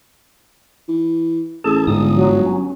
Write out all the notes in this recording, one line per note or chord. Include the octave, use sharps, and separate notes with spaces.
E3
A1 G#4 A4 A5
G1 G#2 D3 D#6
F#3
C#4